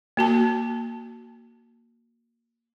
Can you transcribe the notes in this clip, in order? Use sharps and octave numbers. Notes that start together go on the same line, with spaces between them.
A#3 F#4 A5